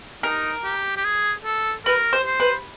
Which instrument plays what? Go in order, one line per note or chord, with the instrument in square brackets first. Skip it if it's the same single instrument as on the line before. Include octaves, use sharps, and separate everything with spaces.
[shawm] D#4 [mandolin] A#4
[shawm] G4
G4
G#4
A4
[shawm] A#4 [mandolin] B4
[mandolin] C5
[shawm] C5
[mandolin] B4